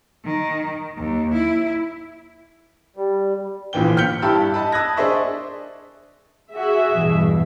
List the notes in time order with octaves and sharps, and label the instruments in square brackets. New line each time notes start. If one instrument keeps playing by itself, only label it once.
[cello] D#3
D#2
E4
[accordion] G3
[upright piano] A#1 A#2 D3 E3 G5 G7
G5 F6 G6 B6 C#7 G7
G2 E4 G4 A5 B5 E6
D#5 A5 B5
A5 D#6 E6 F#6 G#6 A#6
D4 G#4 C5 D#5 E5 C#6
[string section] F#4 [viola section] G#4 E5
[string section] E2 G2 B2